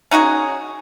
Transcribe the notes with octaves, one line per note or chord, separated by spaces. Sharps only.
C#4 D#4 F#4 G#4